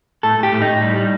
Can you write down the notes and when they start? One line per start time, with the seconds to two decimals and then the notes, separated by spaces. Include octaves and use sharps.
0.23 A2 A4
0.38 A2 G4
0.52 A2
0.62 D#4
0.67 A2
0.81 G3
0.96 G3